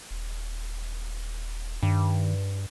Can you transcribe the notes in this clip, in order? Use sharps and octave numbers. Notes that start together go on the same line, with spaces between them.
D#1
G2 D#3